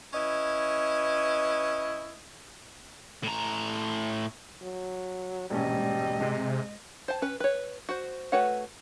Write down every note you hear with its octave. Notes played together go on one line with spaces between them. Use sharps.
C#4 E4 B4 D#5
A2 A#5
F#3
E1 A#1 G#2 G3 C#4 D#5
C3 G#3
C5 A5
C#4 B4
B4 C#5
F#4 C5
A3 F#4 B4 C#5 F#5